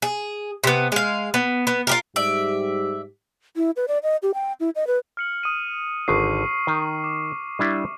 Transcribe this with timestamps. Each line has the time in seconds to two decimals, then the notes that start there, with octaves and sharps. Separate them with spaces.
0.02 G#4
0.64 C3 B3
0.92 G#3 F5
1.34 B3
1.67 B3
1.87 F4 G4 A#4
2.16 G#2 G3 G4 D5 E5
3.56 E4
3.76 B4
3.88 D5
4.03 D#5
4.23 G4
4.34 G5
4.60 E4
4.75 D#5
4.87 B4
5.17 F6 C#7 F#7
5.43 D#6 D#7
6.08 G#1 D3 C#6 D#6 C7
6.67 D#3
7.04 D6
7.59 G3 D4 E4